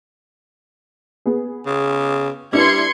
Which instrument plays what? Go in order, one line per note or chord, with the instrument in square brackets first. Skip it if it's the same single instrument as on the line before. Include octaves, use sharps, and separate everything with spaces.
[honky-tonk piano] B3 G#4
[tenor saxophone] C#3
[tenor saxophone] G3 [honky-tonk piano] D4 E4 B4 [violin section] C6 G#6 C#7